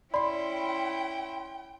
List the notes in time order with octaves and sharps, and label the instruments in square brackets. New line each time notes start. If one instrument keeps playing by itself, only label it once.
[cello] C#4 E4 [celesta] D5 [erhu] G5 [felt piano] B5 C6